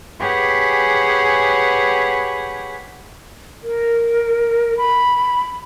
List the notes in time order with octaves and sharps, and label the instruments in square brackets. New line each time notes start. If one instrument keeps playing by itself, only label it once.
[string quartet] G4 G#4 B4 C#5 F#5 G#5
[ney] A#4
B5